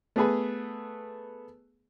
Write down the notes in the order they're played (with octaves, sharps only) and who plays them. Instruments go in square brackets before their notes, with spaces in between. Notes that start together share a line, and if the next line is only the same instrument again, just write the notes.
[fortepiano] A3 B3 G#4 B4